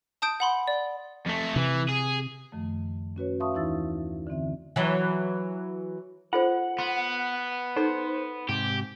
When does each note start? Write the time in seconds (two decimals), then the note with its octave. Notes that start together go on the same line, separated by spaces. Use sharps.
0.22 A5 D#6 G6 D7
0.40 F#5 B5 C6
0.68 D5
1.26 F2 A3
1.56 C3 E3
1.89 G#4
2.52 F#2 D#3 F3 A3
3.16 C#4 F#4 B4 C#5
3.40 E5 F5 A5 C6 C#6 D#6
3.54 D#2 E3 D#4 E4 E6 A6
4.27 D3 E3 C4 E5
4.76 E3 F#3
6.33 F4 A4 C5 F#5
6.79 B3 C6
7.76 D#4 A4 C5 C6
8.49 G#2 C3 G4